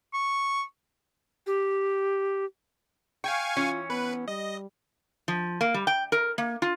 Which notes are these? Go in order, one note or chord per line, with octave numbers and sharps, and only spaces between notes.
C#6
G4
F5 G5 G#5 C#6
E3 C#4 F4 C#5
B3 B4
G3 D#5
F3
A#3
G3
G5
A#4
A#3
F4